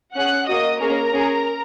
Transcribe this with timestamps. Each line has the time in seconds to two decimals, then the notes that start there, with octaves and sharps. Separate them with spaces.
0.15 C#4 G#4 F#5 F#6
0.48 A#3 F#4 D#5 D#6
0.80 A#3 C#4 G#4 A#4 A#5
1.12 C#4 G#4